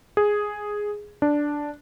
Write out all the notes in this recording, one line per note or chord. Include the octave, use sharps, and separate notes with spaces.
G#4
D4